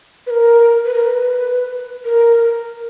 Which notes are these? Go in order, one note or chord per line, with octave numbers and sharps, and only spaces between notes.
B4
A#4
B4
A#4
B4
A#4